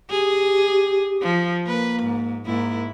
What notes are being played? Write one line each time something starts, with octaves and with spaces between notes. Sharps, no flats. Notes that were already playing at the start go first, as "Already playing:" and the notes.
G4 G#4
F3
A#3 B4
G#2
G#2 A#3 E4